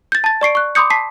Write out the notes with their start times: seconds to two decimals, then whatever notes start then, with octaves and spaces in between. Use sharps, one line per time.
0.12 G6 A6
0.24 A5 A6
0.41 D5 C#6 C7 D7
0.55 C#6 F#6
0.75 B5 C6 D6 D#6 G6 C#7
0.90 A5 B6 C7